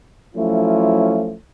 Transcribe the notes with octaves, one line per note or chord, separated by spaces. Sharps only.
F3 F#3 A3 C#4 E4 F4